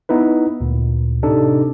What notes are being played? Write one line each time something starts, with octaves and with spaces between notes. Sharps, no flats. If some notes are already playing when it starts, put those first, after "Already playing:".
B3 D#4 E4 B4
D2 A#2
A2 C3 D4 D#4 A4